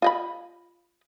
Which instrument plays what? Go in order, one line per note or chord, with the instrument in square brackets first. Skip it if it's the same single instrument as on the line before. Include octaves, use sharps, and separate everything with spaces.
[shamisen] F4 D#5 B5